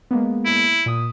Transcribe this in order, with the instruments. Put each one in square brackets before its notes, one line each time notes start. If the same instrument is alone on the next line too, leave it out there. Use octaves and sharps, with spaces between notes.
[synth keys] G#3 A#3 B3
[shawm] E4
[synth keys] A#2 D#6